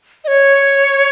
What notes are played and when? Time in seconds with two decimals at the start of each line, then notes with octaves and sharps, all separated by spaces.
0.24 D#5
0.28 C#5